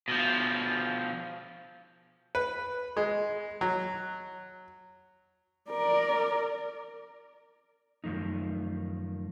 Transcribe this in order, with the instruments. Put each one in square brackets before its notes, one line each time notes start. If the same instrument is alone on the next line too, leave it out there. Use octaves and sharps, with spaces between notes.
[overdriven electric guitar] B2 F3
[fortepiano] B4
G#3
F#3
[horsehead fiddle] A#4 D5
[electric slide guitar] F#2 D#3 F3 A3 D#4